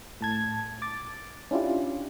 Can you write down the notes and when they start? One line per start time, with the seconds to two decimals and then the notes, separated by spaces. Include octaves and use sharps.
0.21 A2 A5 G#6
0.82 D6 A6
1.51 C#4 D4 E4 F4 G4